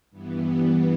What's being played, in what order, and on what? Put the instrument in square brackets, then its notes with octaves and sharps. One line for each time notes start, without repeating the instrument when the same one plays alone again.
[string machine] G2 E3 B3